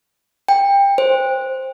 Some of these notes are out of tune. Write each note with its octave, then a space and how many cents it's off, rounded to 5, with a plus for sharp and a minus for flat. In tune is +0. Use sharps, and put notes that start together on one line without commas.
G5 +25
C5 +5